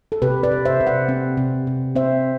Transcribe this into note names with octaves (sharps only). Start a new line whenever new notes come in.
A4
C3 G4 B4
B4 D5
C3
C5 E5
C3
D5 F#5
C4
C3
C3
C4 C5 E5